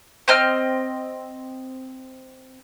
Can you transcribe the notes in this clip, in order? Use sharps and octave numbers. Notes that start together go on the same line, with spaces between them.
C4 D#5 F6